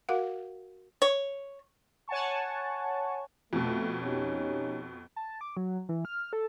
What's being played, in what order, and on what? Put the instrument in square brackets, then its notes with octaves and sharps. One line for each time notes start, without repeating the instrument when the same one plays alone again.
[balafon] F#4 A#4 F5 F#5
[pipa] C#5
[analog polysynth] C#5 F#5 G#5 A5 C#6
[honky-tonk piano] F2 B2 [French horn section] A3
[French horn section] C#4 D#4 G4
[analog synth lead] A5
D6
F#3
E3
F6
A4